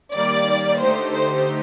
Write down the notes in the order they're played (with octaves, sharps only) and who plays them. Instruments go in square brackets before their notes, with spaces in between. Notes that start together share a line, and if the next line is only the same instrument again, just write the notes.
[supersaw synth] D#3 G3 A#3 [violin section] D5
[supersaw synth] D3 A3 D#4 G4 [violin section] C5
[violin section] C5